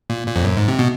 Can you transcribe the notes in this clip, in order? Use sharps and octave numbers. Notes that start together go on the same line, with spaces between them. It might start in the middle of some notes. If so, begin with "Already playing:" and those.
A#2
A#2
F2
F#2
G#2
C3
B2